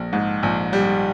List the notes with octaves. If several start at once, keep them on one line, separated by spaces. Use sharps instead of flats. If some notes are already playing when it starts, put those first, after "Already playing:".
Already playing: A#1
G#2
A#1
G3